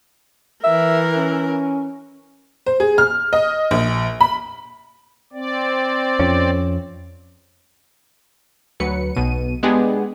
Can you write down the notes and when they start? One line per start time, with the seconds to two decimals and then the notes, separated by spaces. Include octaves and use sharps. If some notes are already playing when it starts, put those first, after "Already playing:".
0.64 E3 A#4 E5
1.16 C#4
2.66 C5
2.80 G#4
2.98 F6
3.33 D#5
3.71 A#1
4.21 B5
5.33 C4 D5
6.19 F2 C#4
8.80 D2 F#3 B4 C#7
9.15 B1 B2 D#7
9.63 G#3 B3 D4 G4 G#4